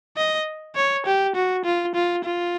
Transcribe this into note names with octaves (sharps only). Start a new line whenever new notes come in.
D#5
C#5
G4
F#4
F4
F4
F4